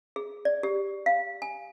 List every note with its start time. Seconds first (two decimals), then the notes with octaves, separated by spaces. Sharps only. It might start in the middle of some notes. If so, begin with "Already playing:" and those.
0.16 G#4
0.45 D5
0.63 G4
1.06 F5
1.42 G#5